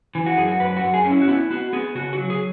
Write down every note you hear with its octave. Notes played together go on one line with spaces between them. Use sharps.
E3
F#4
F#2 G#4
F#4
F#2 B4
F#4
F#2
G#4
C#4
E4
F#4
B3 E4
B3 F#4
B3 G#4
C#3 F#4
F#4
F#3
G#4